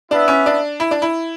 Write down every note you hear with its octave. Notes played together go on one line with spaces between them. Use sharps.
B3 D4 E4 B4 E5
C#4
D4
E4
D4
E4